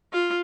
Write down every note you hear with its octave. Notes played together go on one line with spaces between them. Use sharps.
F4